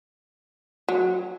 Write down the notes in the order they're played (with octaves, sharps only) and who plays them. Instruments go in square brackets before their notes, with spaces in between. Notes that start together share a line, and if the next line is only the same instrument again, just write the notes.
[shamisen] F#3